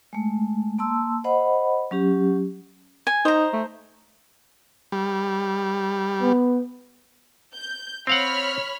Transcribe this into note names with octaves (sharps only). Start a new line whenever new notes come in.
G#3 A3
A#3 A5 C6 E6
C5 D#5 F#5 B5
F#3 C#4 G4
G#5
D#4 C5 A#5
A3
G3
B3
G6
C4 C#5 F5 F#5 B5 F6